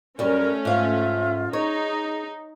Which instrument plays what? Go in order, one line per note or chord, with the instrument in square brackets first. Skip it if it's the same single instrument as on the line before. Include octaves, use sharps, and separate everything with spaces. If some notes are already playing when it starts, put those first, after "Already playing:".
[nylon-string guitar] F#2 G3 [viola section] A3 C#4 [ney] A#4
[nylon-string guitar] G#2 F5 [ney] F4 [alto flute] E5
[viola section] D#4 [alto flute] G#4 [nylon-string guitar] C#5 [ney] D#5